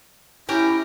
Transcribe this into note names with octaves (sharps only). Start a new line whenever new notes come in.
C#4 E4 G4 A#5